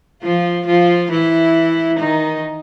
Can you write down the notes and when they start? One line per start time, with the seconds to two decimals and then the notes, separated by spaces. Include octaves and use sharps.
0.24 F3 F4
0.67 F3 F4
1.11 E3 E4
1.99 D#3 D#4